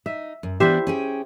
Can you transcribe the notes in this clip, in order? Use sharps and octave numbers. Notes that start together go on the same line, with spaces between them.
D#4 E5
F#2
E3 B3 D4 G4 C5 E5
C#4 G#4 G5